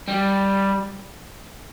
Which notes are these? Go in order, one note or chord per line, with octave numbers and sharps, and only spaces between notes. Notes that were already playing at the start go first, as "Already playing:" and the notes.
G3